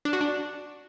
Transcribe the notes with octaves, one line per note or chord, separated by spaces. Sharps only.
D4
F#4
D4